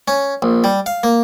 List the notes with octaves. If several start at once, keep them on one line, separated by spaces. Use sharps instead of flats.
C#4
A#1
G3
F5
A#3